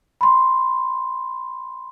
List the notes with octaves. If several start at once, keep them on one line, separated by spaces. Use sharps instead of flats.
B5 C6